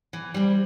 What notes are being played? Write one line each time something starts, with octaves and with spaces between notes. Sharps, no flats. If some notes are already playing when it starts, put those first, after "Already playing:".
E3
G3 C4